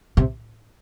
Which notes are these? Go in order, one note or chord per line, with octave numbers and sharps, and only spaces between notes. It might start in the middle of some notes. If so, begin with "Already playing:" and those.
C3